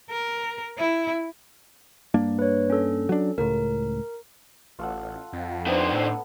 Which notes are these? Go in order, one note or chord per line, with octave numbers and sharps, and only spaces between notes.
A#4
E4
G2 A#3 D4
B4 C#5
C#4 A4
F#3 D4
C#2 A2 A#4
A1 F4 A4 F#5
F2
D#3 B3 D4 C5 A#5
A2 A4 F#5